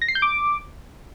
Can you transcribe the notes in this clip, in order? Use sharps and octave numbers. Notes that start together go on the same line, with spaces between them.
A#6
C7
G6
D6